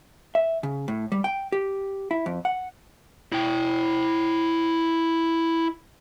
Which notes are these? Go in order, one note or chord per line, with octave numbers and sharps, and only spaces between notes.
E5
C#3
A2
G3
G5
G4
E4
F2
F#5
E4 G5